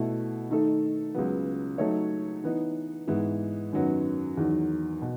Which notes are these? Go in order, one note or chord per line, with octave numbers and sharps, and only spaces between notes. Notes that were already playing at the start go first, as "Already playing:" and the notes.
Already playing: B2 A3 E4
D#3 A3 D#4 A4
C#2 C#3 F#3 B3
F#3 A3 D#4 A4 C#5
E3 B3 D#4
G#2 E3 B3 E4
F#2 D#3 F#3 B3
E2 D#3 F#3
B2